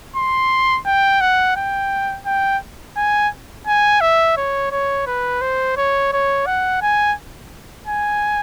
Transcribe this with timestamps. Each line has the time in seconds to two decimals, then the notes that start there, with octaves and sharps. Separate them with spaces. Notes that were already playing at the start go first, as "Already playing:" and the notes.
0.16 C6
0.86 G5
1.21 F#5
1.56 G5
2.26 G5
2.97 G#5
3.67 G#5
4.01 E5
4.37 C#5
4.71 C#5
5.07 B4
5.41 C5
5.77 C#5
6.13 C#5
6.46 F#5
6.82 G#5
7.87 G#5